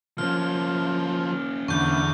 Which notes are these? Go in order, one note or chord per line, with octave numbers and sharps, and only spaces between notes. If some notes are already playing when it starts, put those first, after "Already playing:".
F3 A#3 C#4 F6
E2 D3 C#6 G6